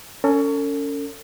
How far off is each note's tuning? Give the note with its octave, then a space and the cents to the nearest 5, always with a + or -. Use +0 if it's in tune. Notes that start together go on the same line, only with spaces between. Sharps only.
C#4 +20 A4 +40